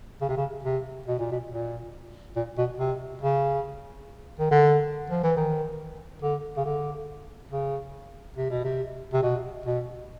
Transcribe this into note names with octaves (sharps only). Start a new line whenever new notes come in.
C#3
C3
C#3
C3
B2
A#2
B2
A#2
A#2
B2
C3
C#3
D#3
D3
F3
E3
D#3
D3
C#3
D3
C#3
C3
B2
C3
C3
B2
B2